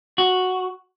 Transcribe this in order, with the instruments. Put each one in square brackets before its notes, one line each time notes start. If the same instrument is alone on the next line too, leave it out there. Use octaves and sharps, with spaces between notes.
[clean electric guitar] F#4